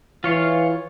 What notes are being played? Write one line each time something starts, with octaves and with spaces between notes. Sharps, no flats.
E3 F4 C#5 F5